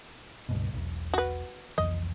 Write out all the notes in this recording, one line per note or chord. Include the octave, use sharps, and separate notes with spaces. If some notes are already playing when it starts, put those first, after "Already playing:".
C#2 G2 B2
E1 B1
F#4 B4
C2 F2 E3 D#5